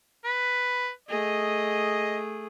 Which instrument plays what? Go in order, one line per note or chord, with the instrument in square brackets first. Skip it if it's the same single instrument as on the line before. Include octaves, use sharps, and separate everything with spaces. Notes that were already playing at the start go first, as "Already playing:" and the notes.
[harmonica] B4
[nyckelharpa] A3 G#4 [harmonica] D#5